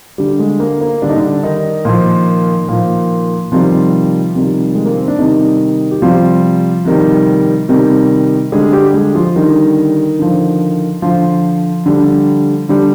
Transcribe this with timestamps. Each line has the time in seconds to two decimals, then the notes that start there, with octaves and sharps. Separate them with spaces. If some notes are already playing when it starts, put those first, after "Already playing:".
0.18 D3 G3 G4
0.39 G#3
0.60 A#3
0.81 A#3
1.02 D3 G3 D4
1.09 D#4
1.17 D3 D4
1.43 D#3 D#4
1.85 A#2 F3
2.69 A#2 F3
3.52 C3 D#3 F3 G3 F4
4.35 C3 D#3 G3
4.75 G#3
4.86 A#3
4.97 C4
5.08 D4
5.18 C3 D#3 G3 D#4
5.91 G4
6.02 C3 F3 G3 F4
6.85 C3 D#3 G3
7.69 C3 D#3 G3
8.52 D3 G3 G#3 G#4
8.73 G3 G4
8.94 G#3 G#4
9.15 F3 F4
9.35 D3 D#3 G3 D#4
10.19 D3 F3
11.02 D3 F3 F4
11.86 D3 G3
12.69 D3 G3